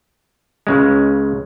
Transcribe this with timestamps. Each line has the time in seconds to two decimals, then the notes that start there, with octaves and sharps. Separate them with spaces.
0.67 C#2 C#3 G#3